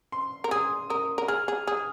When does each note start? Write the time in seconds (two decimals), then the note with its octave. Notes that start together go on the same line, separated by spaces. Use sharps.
0.12 C6
0.44 A#4
0.51 G#4 D#6
0.90 A#4 D#6
1.18 A#4
1.28 G#4 F6
1.48 G#4
1.67 G#4 D#6